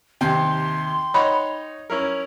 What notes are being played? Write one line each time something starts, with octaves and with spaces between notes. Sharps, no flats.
D#2 C3 G5 C6
D#4 C#5 F#5 B5
C#4 E4 A#4